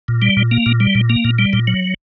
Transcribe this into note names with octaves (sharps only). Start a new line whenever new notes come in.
A#2
G3
A#2
A#3
A#2
G3
A#2
A#3
A#2
G3
A#2
F#3